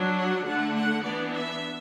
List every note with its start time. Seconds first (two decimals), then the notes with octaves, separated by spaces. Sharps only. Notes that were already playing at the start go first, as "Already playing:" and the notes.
Already playing: F#3 D4
0.17 F#5
0.46 D3 A3 D4 F#5
0.76 F#5
1.04 E3 B3 D4 D5
1.33 E5